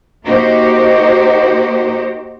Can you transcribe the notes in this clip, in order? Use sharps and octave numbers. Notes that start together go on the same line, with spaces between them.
A#3 D#4 F#4 G4 C5